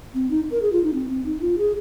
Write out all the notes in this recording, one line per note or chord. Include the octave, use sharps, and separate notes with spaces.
C4
D#4
A#4
G#4
F4
D#4
C4
C4
D#4
F4
G#4